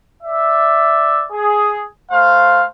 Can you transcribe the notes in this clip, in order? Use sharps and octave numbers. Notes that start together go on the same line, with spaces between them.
D5 E5
G#4
A3 C5 F5